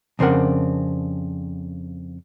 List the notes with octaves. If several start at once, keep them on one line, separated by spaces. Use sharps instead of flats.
F2 C#3 C4 D4 A#4 F#5